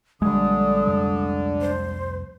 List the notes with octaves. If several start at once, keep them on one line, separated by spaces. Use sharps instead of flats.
A#1 D3 G3 G#3 D#6
C2 F2 A3
C5